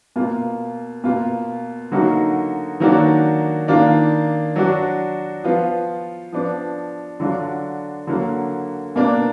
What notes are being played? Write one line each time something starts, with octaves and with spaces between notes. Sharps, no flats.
B2 A#3 F4
B2 A#3 F4
D3 F#3 A#3 D#4 F#4
D#3 F#3 A#3 D4 F#4
D#3 A#3 D4 F4
F#3 D4 F#4
F3 B3 F4
F3 B3 D4
D3 F#3 D4 F4
D3 F#3 A#3
B2 A#3 D4